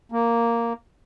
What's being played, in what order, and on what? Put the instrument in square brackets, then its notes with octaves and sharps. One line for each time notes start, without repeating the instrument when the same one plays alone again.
[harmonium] A#3